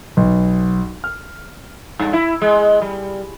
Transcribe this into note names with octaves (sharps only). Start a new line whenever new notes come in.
B1
F6
G2
E4
G#3
G3